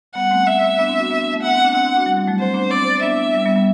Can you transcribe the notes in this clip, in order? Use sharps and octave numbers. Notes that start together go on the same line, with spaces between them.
G3 B3 F#5
A3 C4
E5
B3 D4
C4 E4
D4 F#4
B3 D4
A3
B3 F#5
C4
D4
C4 E4 F#5
C4 E4
D4 F#4
G3
G3
F#3 A3
A3 C4 C5
B3 D4
C4 E4 D5
B3 D4 E5
G3
G3 B3
G3 B3